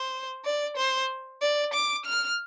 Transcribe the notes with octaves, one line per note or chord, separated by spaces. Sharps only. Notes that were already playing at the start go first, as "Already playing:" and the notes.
Already playing: C5
D5
C5
D5
D6
F6